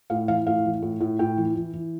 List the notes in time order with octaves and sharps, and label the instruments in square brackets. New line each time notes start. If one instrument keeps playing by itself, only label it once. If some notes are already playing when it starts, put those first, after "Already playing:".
[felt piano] A2 F5
E3 F5
A2 F5
E3
A2
A2
A2 G5
E3
E3
E3